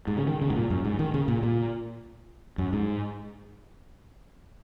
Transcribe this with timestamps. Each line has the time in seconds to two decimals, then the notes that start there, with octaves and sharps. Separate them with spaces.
0.07 G#2
0.17 C#3
0.27 D#3
0.42 C#3
0.50 G#2
0.56 A#2
0.70 F#2
0.85 G#2
0.99 D#3
1.14 C#3
1.28 A#2
1.43 A#2
2.58 F#2
2.73 G#2